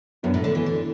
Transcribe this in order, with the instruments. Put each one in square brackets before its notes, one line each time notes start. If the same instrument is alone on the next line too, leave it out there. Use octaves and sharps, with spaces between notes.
[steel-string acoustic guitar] F#2 [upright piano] B2 B3 D4
[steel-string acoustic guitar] A2
D3
E3
D3